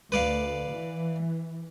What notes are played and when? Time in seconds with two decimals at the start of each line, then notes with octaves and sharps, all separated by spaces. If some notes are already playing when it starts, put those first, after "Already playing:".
0.12 D2 B4 D5 F5
0.72 E3